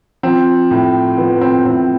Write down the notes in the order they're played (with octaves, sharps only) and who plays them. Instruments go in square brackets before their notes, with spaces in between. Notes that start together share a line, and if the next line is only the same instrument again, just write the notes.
[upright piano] F3 C4
A2
F3 B3
C4
A2 C4